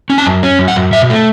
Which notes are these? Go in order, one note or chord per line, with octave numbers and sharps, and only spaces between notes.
C#4
A5
F#2
C#4
F#2
F#5
F#2
B2 E5
A3